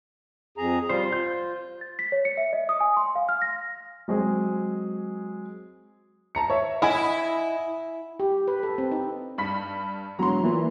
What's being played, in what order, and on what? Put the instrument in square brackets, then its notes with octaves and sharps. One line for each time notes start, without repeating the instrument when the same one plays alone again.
[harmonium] F2 G#4 A#5
[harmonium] G3 F4 [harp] C5
[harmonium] F4 [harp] G6
[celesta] A6
B6
C#5
C#7
E5
D#5
D#6
G#5
C6
F5
F6
A#6
[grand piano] F#3 G#3 C4 G#4
[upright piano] A5 A#5 C#7
C#5 E5
[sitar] E4 [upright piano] D#5 F#5 G#5
[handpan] G4
B4
A4
C4
D#4
[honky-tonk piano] G2 B5 B6
[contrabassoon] E1 [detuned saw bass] F#3 [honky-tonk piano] A#5 C6
[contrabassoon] A#2 [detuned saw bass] E3